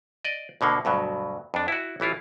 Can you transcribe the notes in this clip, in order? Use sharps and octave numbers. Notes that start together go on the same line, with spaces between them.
D5 D#5
D2 B2 D3 A#3
D2 G2 B2 F#3
F2 D4
E4 F#4
A1 E3 E4 F4